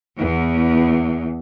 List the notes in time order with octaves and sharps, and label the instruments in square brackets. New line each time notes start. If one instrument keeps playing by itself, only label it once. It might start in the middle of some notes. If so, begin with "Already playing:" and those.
[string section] E2